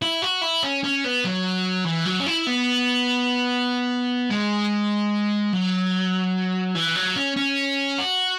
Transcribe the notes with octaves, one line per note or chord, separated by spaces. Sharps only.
E4
F#4
E4
C#4
C#4
B3
F#3
E3
F#3
C#4
E4
B3
G#3
F#3
E3
F#3
C#4
C#4
F#4